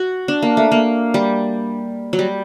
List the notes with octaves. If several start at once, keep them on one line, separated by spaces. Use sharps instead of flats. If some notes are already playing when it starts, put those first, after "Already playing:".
Already playing: F#4
D4
A#3
A3
A#3
G3
F#3
G3